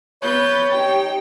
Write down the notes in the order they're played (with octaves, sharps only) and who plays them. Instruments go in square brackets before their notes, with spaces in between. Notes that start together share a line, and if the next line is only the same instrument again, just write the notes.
[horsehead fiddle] B3 B4 [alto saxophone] C#5 [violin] G6 A6
[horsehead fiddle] D#4 G4 [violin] G5